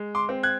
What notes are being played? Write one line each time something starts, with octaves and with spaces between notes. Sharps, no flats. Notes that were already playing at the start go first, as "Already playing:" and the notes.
Already playing: G#3
C6 D6
C4
F#6 G#6